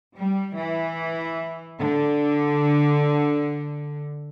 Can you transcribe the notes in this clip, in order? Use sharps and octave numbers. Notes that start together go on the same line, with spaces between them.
G3
E3
D3